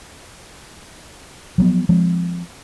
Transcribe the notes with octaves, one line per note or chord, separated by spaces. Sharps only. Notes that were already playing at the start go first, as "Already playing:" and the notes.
F3 F#3 B3
F3 G#3 C4